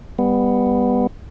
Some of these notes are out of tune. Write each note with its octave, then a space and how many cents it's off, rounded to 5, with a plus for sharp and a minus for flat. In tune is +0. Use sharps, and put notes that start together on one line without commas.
G3 +25 B3 +0